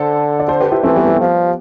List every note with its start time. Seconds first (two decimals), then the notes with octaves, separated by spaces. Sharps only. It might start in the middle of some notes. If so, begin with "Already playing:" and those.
Already playing: D3 A4 C5
0.40 D5
0.48 A4 C5
0.61 G4 B4
0.72 E4 G4
0.83 E3 A3 C4
0.96 G3 B3
1.07 G3 B3
1.20 F3